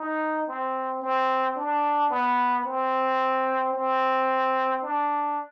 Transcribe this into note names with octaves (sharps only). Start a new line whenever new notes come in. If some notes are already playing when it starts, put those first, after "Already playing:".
Already playing: D#4
C4
C4
D4
B3
C4
C4
D4